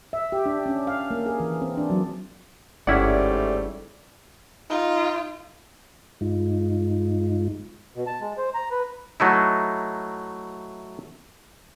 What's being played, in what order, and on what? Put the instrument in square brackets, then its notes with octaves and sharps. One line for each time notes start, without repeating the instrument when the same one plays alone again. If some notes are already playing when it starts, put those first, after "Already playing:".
[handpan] E5
G4
D4
C#4
F5
A#3
G#4
E3
C4
D4
F#3
[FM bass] G1 [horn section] G#2 G3 A3 [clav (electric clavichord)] C#4 E4 F#5 [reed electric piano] D5
[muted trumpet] D#4 [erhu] F4
[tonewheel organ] G2 G#3 D#4 F4
[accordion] B2
A5
G#3
C5
A#5
B4
[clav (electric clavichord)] F#3 A3 D#4 E4